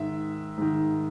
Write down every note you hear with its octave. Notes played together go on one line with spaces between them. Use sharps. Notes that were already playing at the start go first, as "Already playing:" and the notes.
Already playing: G#2 D#3 E5
G#2 D#3